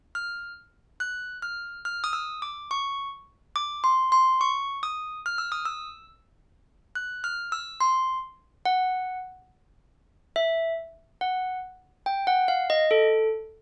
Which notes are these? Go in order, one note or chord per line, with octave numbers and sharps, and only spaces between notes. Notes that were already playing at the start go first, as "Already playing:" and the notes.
F6
F#6
F6
F6
D#6
E6
D6
C#6
D6
C6
C6
C#6
D#6
F6
E6
D#6
E6
F#6
F6
E6
C6
F#5
E5
F#5
G5
F#5
F5
D#5
A4